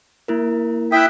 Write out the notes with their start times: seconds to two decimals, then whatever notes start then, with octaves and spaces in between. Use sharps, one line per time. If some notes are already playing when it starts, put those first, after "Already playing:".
0.28 A#3 E4 A#4
0.92 E4 E5 G5 D#6 F#6